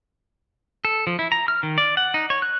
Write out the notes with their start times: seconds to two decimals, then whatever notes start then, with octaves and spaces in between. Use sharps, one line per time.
0.85 A4
1.07 F3
1.19 E4
1.32 A#5
1.48 F6
1.63 D#3
1.78 D5
1.97 F#5
2.14 D#4
2.30 C#5
2.42 F#6